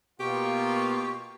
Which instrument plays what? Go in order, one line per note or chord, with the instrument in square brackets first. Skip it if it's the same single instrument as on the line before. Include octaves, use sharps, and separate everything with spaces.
[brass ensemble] B2 A#3 F4 [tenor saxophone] G4 [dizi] C#6